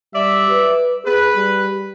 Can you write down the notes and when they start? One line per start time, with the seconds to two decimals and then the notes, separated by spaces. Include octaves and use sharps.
0.14 G3 D5 E5
0.50 B4
1.05 G#4 B4
1.36 G3